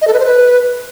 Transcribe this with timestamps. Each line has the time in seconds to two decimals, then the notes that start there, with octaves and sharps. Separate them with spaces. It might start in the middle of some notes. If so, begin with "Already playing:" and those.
0.02 D#5
0.07 A4
0.13 B4
0.19 C5
0.25 B4